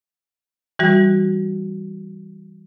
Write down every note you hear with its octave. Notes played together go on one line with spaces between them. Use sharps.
E3 G3 F#4